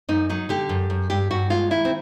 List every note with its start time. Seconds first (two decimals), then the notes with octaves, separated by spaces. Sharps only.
0.09 F#2 D#4
0.30 F#3 D#4
0.49 D3 G4
0.69 F#2
0.90 F#2
1.10 G2 G4
1.31 G2 F#4
1.50 G#3 F4
1.70 D#3 E4
1.85 C4